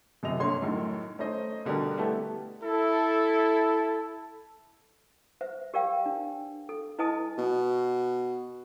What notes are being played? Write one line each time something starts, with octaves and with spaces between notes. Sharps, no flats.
F#1 F#2 C3 D#5 F7
G1 A#3 C#5 C6
F#2 A2 D#3
A3 C#4 D#4 C5 D#5
B2 D3 G3 G4 A#4
A3 B3 E4 G4 A4
E4 A4
B4 C5 E5
G4 A#4 D5 F5 G5
D4
A4
E4 B4 D#5 G#5 A5 D#6
B2